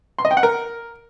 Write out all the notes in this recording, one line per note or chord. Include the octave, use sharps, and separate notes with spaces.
C6
D#5
G5
F#5
A#4